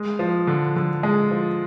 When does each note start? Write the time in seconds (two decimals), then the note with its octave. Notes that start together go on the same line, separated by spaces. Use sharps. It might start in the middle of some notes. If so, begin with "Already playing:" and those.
Already playing: G#3
0.19 F3
0.47 D3
0.76 D3
1.03 G#3
1.31 F3